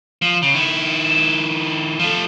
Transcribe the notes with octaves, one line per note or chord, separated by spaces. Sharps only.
F3
C#3
D#3 E4
F3 A3